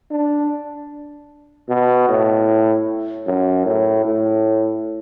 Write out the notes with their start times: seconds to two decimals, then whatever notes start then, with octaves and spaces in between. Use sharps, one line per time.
0.11 D4
1.68 B2
2.09 A2
3.26 F#2
3.65 A2
4.05 A2